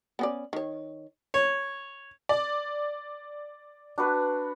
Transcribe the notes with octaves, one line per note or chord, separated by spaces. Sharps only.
B3 C#4 D5
D#3 C#5
C#5
D5
D4 F#4 B4